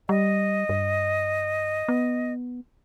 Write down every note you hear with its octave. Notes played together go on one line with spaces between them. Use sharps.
G3 D#5
G2
B3